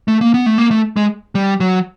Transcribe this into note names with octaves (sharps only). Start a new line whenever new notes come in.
A3
A#3
B3
A3
A#3
A3
G#3
G3
F#3